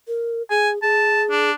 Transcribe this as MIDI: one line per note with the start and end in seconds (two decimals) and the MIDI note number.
0.08 0.43 70
0.50 0.81 68
0.50 0.70 80
0.82 1.51 68
0.82 1.23 81
1.30 1.53 62